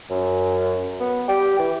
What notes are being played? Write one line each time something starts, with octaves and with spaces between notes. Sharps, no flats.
F#2
B3
G4
E3